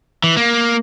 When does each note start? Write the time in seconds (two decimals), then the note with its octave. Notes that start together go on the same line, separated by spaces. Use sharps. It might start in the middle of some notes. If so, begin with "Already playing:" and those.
0.24 E3
0.37 A#3